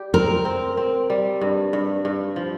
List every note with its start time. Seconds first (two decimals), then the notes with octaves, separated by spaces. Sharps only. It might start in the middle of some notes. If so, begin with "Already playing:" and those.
Already playing: G3 G4
0.14 C4 A#4
0.45 C4
0.77 C4
1.10 G3
1.41 G2
1.73 G2
2.05 G2
2.36 F3